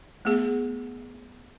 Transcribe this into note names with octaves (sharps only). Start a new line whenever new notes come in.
A3 B3 G#4